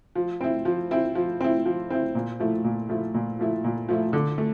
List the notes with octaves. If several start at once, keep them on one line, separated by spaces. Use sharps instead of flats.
F3
C4 E4
F3
C4 E4
F3
C4 E4
F3
C4 E4
A#2
F3 A3 E4
A#2
F3 A3 E4
A#2
F3 A3 E4
A#2
F3 A3 E4
D3
A3